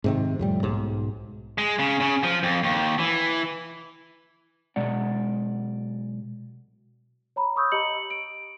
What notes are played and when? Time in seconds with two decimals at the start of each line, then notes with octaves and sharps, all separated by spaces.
0.04 G#2 C3 D#3
0.39 F2 A2 G3
0.63 B1 G#2
1.58 G#3
1.79 C#3
2.00 C#3
2.23 F3
2.43 F2
2.63 D#2
2.99 E3
4.76 B1 B2 G#3 D5 F#5
7.36 C#5 A#5 B5
7.56 B5 C#6 D#6 E6 G6
7.72 G4 D#5 A#5 B5 C#7 F#7
8.10 D7